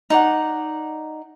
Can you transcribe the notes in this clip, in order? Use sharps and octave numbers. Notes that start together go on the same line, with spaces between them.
D#4 D5 F#5